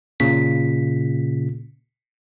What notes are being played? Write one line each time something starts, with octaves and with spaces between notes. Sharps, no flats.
A#2 C#3 B6